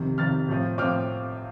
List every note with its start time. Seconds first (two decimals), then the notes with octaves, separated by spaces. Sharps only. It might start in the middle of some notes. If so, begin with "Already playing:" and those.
Already playing: F2 C3 D#3
0.18 F2 C3 D#3 F6 A6
0.48 A2 F3 C4
0.78 A2 F3 C4 D6 F6